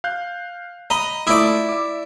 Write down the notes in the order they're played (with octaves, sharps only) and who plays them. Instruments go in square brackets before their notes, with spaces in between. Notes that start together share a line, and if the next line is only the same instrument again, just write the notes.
[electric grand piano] F5 F#6 G6
[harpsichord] D#5 [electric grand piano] A#5 B5
[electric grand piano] A3 F4 D#6 [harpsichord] E4 D5
[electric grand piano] E5 D6